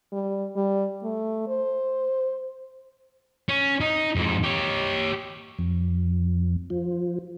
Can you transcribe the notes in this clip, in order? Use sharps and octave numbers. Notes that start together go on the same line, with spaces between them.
G3
G3
A3
C5
C#4
D#4
F2 G#2
G4 C#5
F2
F3